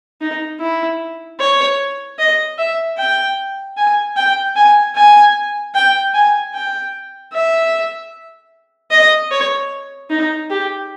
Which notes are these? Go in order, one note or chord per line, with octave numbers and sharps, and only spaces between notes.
D#4
E4
C#5
D#5
E5
G5
G#5
G5
G#5
G#5
G5
G#5
G5
E5
D#5
C#5
D#4
G4